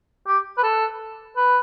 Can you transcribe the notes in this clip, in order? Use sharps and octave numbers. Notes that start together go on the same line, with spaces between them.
G4
B4
A4
B4